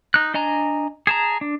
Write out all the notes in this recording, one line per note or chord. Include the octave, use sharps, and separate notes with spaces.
D#4 F#6
D4 D#5 G#5 A#5
G#4 A5 A#5
D4